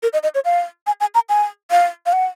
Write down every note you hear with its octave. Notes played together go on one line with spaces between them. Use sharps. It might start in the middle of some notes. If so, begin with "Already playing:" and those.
A#4
D#5
D#5
C#5
F5
G#5
G#5
A#5
G#5
F5
F5
F#5